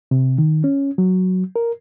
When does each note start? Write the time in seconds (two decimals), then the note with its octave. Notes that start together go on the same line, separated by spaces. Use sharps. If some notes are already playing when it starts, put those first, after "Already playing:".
0.11 C3
0.38 D#3
0.64 C#4
0.98 F#3
1.56 A#4